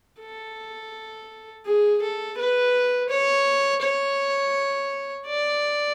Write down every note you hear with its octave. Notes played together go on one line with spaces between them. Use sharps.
A4
G#4
A4
B4
C#5
C#5
D5